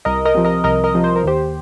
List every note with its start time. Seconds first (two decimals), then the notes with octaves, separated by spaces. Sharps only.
0.05 C2 A#4 D#5
0.25 A#4 D#5
0.35 C3 F3
0.45 A#4 D#5
0.64 C2 A#4 D#5
0.84 A#4 D#5
0.95 C3 F3
1.04 C5
1.16 A#4
1.23 D#2 G4 C5